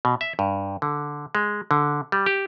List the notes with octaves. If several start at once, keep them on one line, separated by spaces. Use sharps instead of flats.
B2
E5
G2
D3
G#3
D3
G3
G4